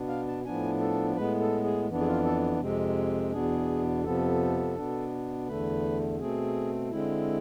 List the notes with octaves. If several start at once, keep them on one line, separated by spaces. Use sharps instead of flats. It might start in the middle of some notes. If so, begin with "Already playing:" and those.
Already playing: B2 B3 D4
F5
A5
A2 F3 B3 D4 G#5
A4
A2 G#3 B3 B4
A4
G#4
F2 E3 B3 D4
G#4
F4
A4
F2 C3 G#3 C4
E2 B2 B3 D4 G#4
F2 C3 F3 B3 A4
B2 B3 D4
E2 D3 A3 B4
B2 A3 C4 G#4
D3 G#3 C4 E4